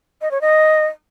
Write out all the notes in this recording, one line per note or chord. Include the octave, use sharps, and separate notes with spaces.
D#5
C#5
D#5